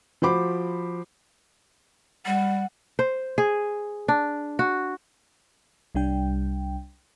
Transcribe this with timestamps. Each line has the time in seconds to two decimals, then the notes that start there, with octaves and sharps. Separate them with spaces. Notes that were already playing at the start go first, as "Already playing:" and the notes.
0.22 F3 F#4 C5 B5 D6
2.26 G3 F#5
2.99 C5
3.38 G#4
4.08 D4
4.59 F#4
5.95 C2 G3 D4 G5